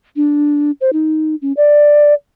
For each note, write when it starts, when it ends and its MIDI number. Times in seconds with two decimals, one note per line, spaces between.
0.16 0.71 62
0.81 0.90 72
0.93 1.35 63
1.42 1.53 61
1.57 2.14 74